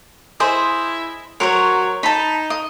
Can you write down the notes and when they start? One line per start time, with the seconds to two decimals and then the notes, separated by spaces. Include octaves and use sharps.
0.40 E4 G#4 C5 D#5
1.40 F#3 A#4 C5 C#5
2.03 D#4 A5 B5
2.50 D#5